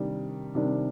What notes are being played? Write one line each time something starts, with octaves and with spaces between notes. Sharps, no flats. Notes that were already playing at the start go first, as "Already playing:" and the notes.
Already playing: C3 D#3 G3 D4
C3 D#3 G3 D4